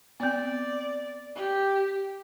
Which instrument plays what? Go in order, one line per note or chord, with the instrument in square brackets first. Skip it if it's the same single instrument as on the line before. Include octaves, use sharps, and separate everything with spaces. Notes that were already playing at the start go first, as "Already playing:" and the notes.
[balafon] B3 C4 [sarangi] D5
[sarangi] G4